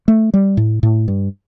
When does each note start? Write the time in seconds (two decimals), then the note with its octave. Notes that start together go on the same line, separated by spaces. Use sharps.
0.08 A3
0.34 G3
0.57 A2
0.83 A2
1.08 G2